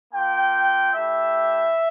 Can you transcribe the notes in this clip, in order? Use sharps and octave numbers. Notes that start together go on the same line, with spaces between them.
A#3 F4 G5
A3 E4 G4 E5